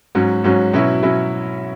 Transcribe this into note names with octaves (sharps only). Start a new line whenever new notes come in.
G#2 F#3 C#4
G#2 F#3 C#4
B2 F#3 C#4 E4
B2 F#3 C#4 E4